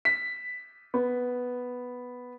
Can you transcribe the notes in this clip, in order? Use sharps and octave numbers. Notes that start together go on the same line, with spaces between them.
B6
B3